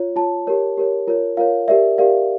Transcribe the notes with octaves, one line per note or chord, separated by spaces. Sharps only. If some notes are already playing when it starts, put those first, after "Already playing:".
Already playing: F4 C#5
F4 C#5 A5
G4 A#4 C#5
G4 A#4 C#5
F4 A#4 C#5
F4 A#4 C#5 F5
G4 A#4 D5 E5
G4 A#4 D5 F5